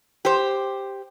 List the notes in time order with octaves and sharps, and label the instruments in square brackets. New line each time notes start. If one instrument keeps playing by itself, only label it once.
[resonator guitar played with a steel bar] G4 C5